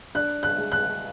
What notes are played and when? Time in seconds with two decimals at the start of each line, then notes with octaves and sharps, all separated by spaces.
0.15 D4 F#6
0.43 F#6
0.58 G#3
0.72 F#6